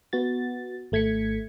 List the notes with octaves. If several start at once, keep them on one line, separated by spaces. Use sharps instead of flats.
B3 F#4 A6
G#1 A3 G#6 B6 C#7